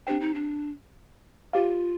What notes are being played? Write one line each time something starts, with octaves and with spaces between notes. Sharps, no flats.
C4 D4 G4 C5 G5
D#4
D4
F4 G4 C5 F5